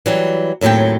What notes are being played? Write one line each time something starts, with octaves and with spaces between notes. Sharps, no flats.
E3 F#3 G3
D#2 A2 F#3 C4 G5